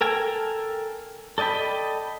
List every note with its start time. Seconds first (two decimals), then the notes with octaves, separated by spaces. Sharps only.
0.01 A4 A#4 G5 G#5
1.38 A4 D5 D#5 G5 B5